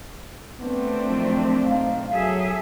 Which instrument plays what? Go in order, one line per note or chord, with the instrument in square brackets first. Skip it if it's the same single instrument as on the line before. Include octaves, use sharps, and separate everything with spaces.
[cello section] A3 C4 D4 [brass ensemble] B3
[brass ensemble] F#2 D#3 F3
B1 D#4 F5
[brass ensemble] F#2 F#3 [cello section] G#4 A4 E5